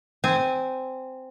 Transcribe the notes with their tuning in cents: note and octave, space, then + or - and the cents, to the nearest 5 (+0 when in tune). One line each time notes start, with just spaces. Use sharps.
C4 -10 G#5 +0